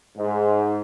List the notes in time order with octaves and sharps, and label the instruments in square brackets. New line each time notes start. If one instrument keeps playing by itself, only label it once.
[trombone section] G#2